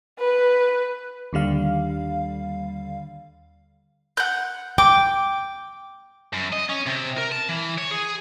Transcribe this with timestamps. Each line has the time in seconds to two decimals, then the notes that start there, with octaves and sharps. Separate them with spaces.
0.19 B4
1.33 D#2 D3 G3 F5
4.17 F#5 G6
4.78 G5 D6
6.33 F#2
6.52 D#5
6.69 C#4
6.86 C3
7.18 A#4
7.32 A5
7.49 E3
7.78 C#5
7.91 G#4